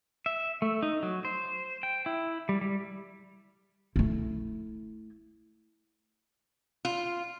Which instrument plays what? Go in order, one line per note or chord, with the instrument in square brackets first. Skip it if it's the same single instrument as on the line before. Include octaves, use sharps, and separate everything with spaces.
[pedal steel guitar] E5
A3
D#4
F#3
C5
G5
E4
G3
G3
[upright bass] A3 E4
[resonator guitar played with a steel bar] F4